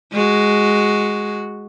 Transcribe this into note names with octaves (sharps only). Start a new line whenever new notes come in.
G#3 F#4